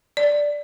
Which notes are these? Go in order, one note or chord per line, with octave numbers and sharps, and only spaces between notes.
D5